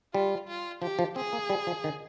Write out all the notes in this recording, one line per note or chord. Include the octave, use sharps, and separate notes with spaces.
G3 F4
F4
F3 G4
F3
C4 G#4
A#3
G3
F3
D#3